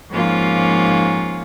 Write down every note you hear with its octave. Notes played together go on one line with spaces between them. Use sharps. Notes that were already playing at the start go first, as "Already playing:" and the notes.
G#2 F3 A#3 C#4 F4